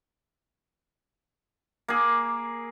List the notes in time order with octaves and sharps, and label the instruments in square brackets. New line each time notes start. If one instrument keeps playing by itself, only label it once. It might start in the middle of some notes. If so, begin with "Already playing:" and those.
[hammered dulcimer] A#3 G#4